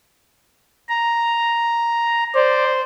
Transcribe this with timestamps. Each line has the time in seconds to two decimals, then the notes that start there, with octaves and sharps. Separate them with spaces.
0.89 A#5
2.35 C5 D5